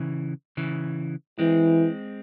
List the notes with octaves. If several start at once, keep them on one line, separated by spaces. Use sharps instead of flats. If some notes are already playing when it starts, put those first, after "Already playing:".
Already playing: C#3 E3
C#3 E3
E3 G#3 C4